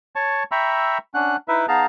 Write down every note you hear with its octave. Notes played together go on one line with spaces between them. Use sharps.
C#5 A5 C#6
E5 G5 A#5 B5 C#6 E6
C#4 D4 F#5 F#6
D#4 E4 B4 E5
B3 D#4 G#4 F5 A5 A#5